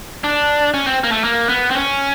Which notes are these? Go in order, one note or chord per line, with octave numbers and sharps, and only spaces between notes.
D4
C#4
C4
A#3
A3
A#3
B3
C4
C#4